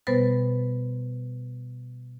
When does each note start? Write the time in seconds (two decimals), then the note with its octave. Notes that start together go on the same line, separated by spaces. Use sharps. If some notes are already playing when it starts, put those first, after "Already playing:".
0.07 B2 G3 B3 B4 C5 A6